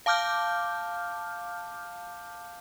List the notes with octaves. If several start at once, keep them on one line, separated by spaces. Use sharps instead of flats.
F5 A5 D6 F6 G6